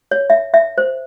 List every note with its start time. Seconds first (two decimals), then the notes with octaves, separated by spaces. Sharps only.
0.11 C#5
0.30 E5
0.54 E5
0.78 C5